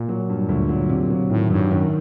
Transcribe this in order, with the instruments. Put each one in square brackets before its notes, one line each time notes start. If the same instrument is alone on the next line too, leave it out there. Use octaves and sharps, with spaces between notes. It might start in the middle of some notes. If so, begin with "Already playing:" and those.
Already playing: [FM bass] A#2
[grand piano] F#3
G2
D2
F#3
C3
F#3
[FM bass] A2 [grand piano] D#3
[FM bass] G2 [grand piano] F#3
[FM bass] F#2 [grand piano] D#3